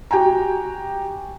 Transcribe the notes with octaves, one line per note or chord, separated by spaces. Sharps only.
F#4 G4 G5 G#5 A#5